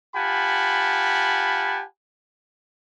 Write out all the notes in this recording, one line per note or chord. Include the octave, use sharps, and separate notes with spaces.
F4 G4 F#5 G#5 A5 B5